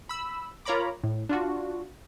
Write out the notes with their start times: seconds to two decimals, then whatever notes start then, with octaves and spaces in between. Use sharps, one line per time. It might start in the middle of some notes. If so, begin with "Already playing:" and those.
0.09 B5 E6
0.65 F4 A#4 C#5 A#5 B5 D6
1.04 A2
1.29 D4 F4 F#4